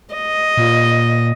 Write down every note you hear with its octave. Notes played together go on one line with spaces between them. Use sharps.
D#5
A#2